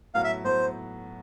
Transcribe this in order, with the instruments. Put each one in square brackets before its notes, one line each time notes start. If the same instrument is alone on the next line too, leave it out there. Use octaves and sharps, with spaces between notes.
[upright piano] A2 F#3 B3 [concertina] F5
[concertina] E5
[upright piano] A2 F#3 B3 [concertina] C5